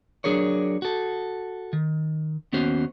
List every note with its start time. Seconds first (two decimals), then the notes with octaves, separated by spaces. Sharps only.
0.24 F#3 D4 G#4 A#4 C#5
0.82 F#4 A4
1.73 D#3
2.53 D#2 B3 C#4 F#4 C5